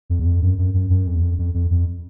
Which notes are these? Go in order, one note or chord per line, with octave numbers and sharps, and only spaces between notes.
F2
E2
F2
F#2
F#2
F#2
F#2
F2
E2
F2
F2
F2
F2